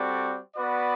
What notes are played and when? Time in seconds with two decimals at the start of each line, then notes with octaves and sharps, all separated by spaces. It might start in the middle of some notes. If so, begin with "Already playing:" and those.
Already playing: G3 C4 F#4 A4 D5
0.56 B3 F#4 B4 D5